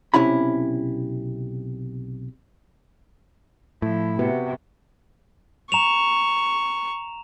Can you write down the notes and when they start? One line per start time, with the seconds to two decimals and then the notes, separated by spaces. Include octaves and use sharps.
0.14 B1 C3 C#4 E4 B5
3.82 A2 F3 E4
4.19 C3 B3 F#4 B4
5.72 A#5 C#6 E7 F7